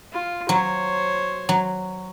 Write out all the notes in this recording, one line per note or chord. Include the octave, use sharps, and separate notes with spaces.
F4
F#3 C5 C#5
F#3